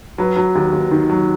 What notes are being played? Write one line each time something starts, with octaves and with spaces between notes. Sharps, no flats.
F#3 B4
F#3
D#2
D#2
D#3
F#3